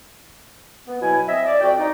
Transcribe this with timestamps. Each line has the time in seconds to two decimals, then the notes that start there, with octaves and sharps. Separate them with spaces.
0.87 B3
1.01 B2 F#3 E4 G#5
1.27 C4 D#5 E5
1.46 D5
1.61 F2 F#4 D5 G5
1.78 D#4